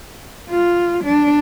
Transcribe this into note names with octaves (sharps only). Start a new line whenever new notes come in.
F4
D4